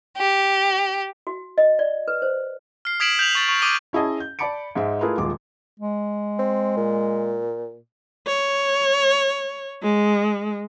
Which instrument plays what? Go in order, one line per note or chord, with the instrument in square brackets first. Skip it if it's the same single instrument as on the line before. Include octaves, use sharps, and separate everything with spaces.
[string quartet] G4
[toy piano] F#4
D#5
D5
B4
C5
[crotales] F6 C7
D#6 G#6 B6 D7 E7 F#7
G6 B6 F7 F#7
C#6 A6
C#6
D6 D#6 D#7 G7
[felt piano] C#4 E4 G#4 D#5 A5
G6
D5 A5 B5 D6 C#7 D7
G#2 G#3 E5
A3 E4 F4 G#4 A#4 B4
D#1 G#3 F4 D6
[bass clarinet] G#3
[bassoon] C4
A#2
[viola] C#5
G#3